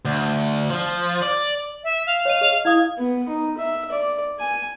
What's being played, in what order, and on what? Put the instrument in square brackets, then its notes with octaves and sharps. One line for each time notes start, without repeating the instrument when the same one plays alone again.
[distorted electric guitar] D2
F3
D5
[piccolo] E5
F5
[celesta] C#5 D#5 D#7
G#4 D#5
[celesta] E4 F5 D#6 [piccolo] G#6
[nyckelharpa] B3
D#4
E5
D5
G#5